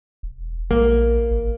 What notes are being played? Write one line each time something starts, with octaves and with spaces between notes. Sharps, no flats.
E1
A#1 A#3
G#1